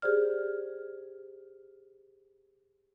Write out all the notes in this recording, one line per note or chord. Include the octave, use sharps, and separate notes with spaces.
G4 G#4 C5 D5 F6